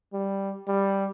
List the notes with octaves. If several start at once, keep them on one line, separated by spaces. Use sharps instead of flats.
G3
G3